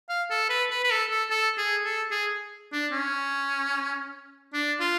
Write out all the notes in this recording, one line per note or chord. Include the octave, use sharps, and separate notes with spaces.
F5
A4
B4
B4
B4
A4
A4
A4
G#4
A4
G#4
D4
C#4
D4
F4